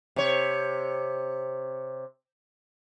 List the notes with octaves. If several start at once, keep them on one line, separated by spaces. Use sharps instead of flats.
C3 C#5